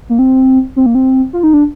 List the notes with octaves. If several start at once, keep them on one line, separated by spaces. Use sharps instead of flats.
A#3
C4
C4
A#3
C4
F4
D#4
D4